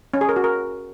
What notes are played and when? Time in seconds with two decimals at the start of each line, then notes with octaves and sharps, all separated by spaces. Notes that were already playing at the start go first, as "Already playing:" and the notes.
0.14 C#4
0.21 G#4
0.29 A#4
0.36 F#4
0.44 A#4